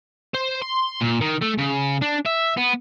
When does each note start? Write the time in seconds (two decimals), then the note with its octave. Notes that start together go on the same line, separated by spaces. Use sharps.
0.34 C5
0.62 C6
1.01 A#2
1.21 D#3
1.42 A3
1.58 C#3
2.01 D4
2.25 E5
2.57 B3